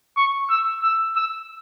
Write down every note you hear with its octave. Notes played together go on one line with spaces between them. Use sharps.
C#6
E6
E6
E6